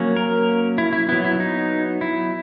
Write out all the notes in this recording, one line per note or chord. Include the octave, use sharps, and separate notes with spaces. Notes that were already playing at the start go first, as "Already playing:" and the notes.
Already playing: F#3 A#3 C#4
A#4
E4
E4
F#3 B3 E4
E4
D#4
E4